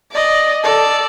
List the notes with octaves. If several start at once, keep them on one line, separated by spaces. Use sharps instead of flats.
D5 D#5
A4 D5